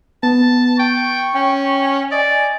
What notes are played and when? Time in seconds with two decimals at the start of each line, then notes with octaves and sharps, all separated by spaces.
0.23 B3 A5
0.79 G5 C#6
1.35 C#4 G5
2.11 D5 D#5 G#5